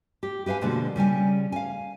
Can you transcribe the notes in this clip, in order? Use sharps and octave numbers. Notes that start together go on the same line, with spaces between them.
G4
G4 B4 E5 F5 G#5
B2 D3 F3 G#3 A#3 F#4
C#3 G3 C#4 G#5
F5 G#5